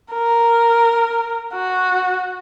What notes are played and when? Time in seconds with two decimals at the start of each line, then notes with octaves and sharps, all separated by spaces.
0.13 A#4
1.54 F#4